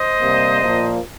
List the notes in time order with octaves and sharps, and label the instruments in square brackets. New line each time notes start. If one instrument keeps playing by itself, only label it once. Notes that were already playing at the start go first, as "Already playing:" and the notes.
Already playing: [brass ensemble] C5 D#5
C3 G3 A#3
A#2 F3 A#3